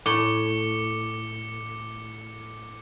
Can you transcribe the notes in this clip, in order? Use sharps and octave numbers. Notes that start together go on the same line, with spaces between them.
A2 D6 C#7 G7